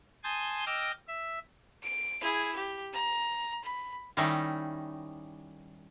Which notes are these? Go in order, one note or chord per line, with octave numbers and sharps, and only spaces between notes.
G#5 A5 C6 D#6 G6 G#6
D#5 G5 D6 E6 F6 A#6
E5
D7
E4 G#4
G4
A#5
B5
D#3 G3 C#4 D#4 E4